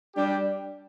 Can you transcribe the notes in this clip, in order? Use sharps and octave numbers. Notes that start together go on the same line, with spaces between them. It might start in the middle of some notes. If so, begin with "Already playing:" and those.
G3 D4 G4